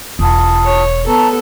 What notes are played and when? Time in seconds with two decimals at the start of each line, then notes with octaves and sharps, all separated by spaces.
0.19 E1 F4 A5 D#6
0.64 C#5
1.06 B3 A4 A5 A#5 C#6